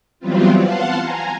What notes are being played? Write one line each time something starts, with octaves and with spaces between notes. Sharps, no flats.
E3 F#3 G3 B3 C4 F4
F5 F#5 A5 C6
G#5 A#5